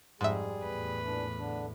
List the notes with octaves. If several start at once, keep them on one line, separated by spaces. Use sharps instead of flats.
F2 G#2 G3 G#4 E5
E2 A2 B4
A#2 E3 D4
D3 D4